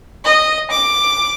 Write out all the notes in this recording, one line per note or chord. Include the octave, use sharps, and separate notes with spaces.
D#5
D6